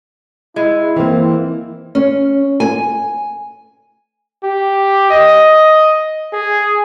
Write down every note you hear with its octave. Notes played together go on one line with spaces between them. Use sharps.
G#3 E4
E3 A#3 C4
C#4
G#5
G4
D#5
G#4